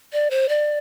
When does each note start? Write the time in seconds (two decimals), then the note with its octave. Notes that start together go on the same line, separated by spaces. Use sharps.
0.13 D5
0.30 C5
0.49 D5